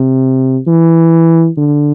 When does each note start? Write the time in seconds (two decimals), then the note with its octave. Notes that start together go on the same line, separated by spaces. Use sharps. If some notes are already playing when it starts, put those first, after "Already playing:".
Already playing: C3
0.67 E3
1.57 D3